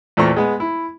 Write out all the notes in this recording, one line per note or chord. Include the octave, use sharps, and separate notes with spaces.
E2 A#2 A3 C4 A#5 C#6
G#3 B3
E4